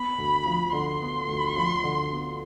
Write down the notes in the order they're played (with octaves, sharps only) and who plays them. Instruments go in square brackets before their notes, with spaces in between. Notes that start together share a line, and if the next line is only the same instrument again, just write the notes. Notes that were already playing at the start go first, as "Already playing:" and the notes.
Already playing: [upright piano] B3 [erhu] B5
[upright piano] D2
F3
[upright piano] D3 [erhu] C6
[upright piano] B3
D2
F3
D3
B3